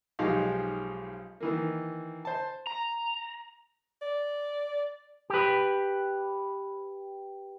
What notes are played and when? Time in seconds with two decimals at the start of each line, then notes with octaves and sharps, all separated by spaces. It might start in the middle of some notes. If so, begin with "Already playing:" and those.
0.19 B1 F3 G#3 D#4 G4 F5
1.40 D#3 E3 A#3
2.25 C5 A5
2.67 A#5
4.02 D5
5.30 G4 B4